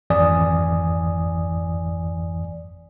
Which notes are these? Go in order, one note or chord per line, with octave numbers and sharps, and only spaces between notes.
G#1 F2 E3 D5 G#5 D#6